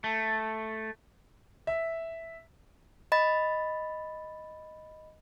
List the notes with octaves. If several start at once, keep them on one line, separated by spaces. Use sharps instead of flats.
A3
E5
D#5 B5 A6